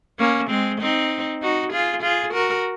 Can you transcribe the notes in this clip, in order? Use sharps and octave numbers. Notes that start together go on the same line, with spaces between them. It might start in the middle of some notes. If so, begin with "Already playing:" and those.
A#3 C#4
G#3 C4
C4 D#4
D#4 F#4
F4 G#4
F4 G#4
F#4 A#4